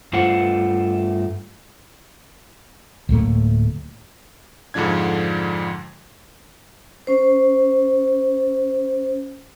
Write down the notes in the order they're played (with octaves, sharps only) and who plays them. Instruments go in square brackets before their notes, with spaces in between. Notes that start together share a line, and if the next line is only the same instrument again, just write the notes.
[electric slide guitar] G2 A3 F4 C5 F#5
[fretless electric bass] D1 A2 A3 A#3
[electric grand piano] F2 G#2 D3 F3 D4 G#6
[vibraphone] C#4 C5